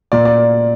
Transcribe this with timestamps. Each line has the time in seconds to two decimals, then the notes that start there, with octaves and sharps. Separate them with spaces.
0.12 A#2 D5
0.25 D5